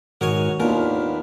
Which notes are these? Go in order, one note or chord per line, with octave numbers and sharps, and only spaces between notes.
G#2 D#3 F#4 A#4 C#5 G#5
D#2 A#3 B3 D4 F4 A#4